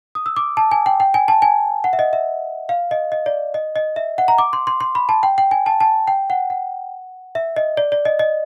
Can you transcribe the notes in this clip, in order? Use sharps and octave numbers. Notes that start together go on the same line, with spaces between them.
D#6
E6
D6
A5
G#5
G5
G5
G#5
A5
G#5
F#5
E5
D#5
E5
F5
D#5
D#5
D5
D#5
D#5
E5
F#5
A#5
D6
C6
C6
C6
B5
A5
G5
G5
G#5
A5
A5
G5
F#5
F#5
E5
D#5
D5
D5
D#5
D#5